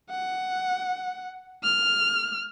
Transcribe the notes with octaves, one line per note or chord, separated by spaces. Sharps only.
F#5
F6